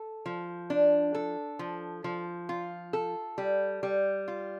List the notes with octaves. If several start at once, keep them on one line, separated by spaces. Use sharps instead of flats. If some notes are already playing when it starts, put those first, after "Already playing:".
Already playing: A4
F3
D4
A4
F3
F3
F4
A4
G3
G3
F4